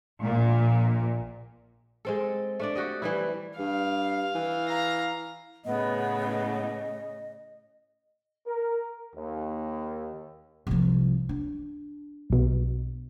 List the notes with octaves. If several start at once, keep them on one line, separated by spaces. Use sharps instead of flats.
A#1 A#2
G#3 C4 A4
A3 D4 D5
F#4 G4 D#5
E3 G3 E4
G2 F5
E3
F5 A#5
A2 C#3 B3 D#5
A#4
D#2
C2 F3
D4
B1 B2